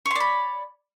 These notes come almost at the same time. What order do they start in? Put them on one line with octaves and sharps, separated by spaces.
C#5 C6 D5 B5